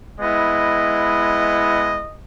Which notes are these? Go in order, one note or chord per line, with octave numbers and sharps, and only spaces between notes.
G#3 B3 E4 D#5